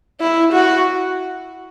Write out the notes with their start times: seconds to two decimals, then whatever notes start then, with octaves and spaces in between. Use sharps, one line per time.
0.20 E4
0.53 F#4